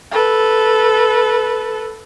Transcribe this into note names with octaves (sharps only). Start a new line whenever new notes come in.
A4 B4